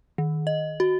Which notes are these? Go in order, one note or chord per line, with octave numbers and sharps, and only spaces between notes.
D#3
D#5
F#4